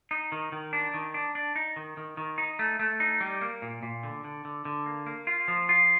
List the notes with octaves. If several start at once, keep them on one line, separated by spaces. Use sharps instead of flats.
D#4
D#3
D#3
D4
D#3
D4
D4
D#4
D#3
D#3
D#3
D#4
A3
A3
D#4
G3
A#3
A#2
A#2
D3
D3
D3
D3
A#3
A#3
F4
F3
F4